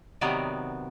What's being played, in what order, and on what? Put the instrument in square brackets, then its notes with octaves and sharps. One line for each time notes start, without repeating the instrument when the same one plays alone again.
[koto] C3 D#3 F#3 B3 D#4 D5